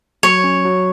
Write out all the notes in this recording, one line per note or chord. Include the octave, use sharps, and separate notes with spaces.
F#3 C#5
C#4
F#3